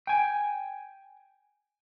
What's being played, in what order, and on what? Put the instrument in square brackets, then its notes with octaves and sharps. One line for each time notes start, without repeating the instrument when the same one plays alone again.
[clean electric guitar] G5 G#5